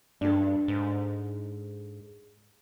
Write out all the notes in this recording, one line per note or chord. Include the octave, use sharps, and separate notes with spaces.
G2 D4 A4
G#2